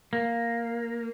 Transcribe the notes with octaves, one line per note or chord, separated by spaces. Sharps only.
A#3